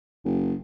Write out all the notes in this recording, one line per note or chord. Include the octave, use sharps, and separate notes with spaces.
F#1